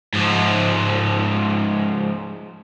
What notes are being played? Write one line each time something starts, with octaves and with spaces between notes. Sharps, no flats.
G#2 F3